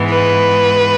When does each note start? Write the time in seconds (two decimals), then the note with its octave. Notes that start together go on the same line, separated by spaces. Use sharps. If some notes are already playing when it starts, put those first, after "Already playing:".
Already playing: G#2 E3 G#3 B3
0.10 B4